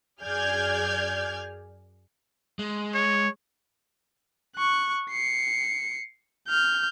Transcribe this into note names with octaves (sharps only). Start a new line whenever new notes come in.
F#2 G#4 D5 F6 G6 G#6
G#3
C#5
C#6 F#6
C7 C#7
F6 G6